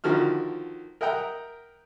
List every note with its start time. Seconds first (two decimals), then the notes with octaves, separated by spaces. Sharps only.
0.04 D3 D#3 F3 F#4 F6
1.01 A#4 D#5 E5 F#5 G5 A#5